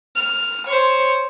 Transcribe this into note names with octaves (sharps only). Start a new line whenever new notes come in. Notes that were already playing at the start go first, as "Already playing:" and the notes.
F6
C5 C#5